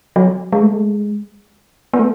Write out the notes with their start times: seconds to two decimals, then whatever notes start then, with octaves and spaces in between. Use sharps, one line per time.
0.16 F#3
0.53 G#3
0.63 A3
0.73 G#3
1.94 B3
1.99 A3